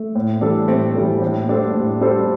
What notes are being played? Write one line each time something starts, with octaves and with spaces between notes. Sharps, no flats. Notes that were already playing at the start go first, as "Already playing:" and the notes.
Already playing: A3
A2
E3 G3 D4 A4
A2 A3 C4
E3 G3 D4 A4
A2
G3 D4 A4 C5
A2
G3 D4 A4 C5